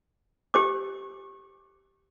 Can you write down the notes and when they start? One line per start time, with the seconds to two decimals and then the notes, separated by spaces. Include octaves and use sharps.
0.54 G4 C5 D6